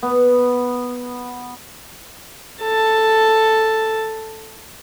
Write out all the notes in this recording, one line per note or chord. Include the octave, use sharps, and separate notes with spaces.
B3
A4 A5